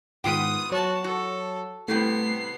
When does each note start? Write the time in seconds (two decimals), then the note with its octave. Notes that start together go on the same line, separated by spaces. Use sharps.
0.24 G#2 D#3 G#3 B3 F4 G5 D#6 D#7
0.72 F#3 F#4 C#5 A5
1.04 F#4 A4
1.88 A2 C3 G3 A3 B3 C7